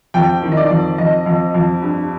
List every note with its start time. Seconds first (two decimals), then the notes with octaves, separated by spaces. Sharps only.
0.14 F2 G5
0.42 D#3
0.52 D#5
0.57 D5
0.70 F2
0.98 F2 D#5
1.26 F2
1.55 F2
1.82 G2